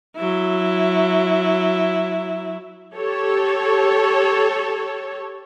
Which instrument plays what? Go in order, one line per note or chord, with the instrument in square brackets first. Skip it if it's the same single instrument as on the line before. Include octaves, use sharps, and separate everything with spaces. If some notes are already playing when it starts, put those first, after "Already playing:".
[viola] F#3 E4
[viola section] G4 A4 C#5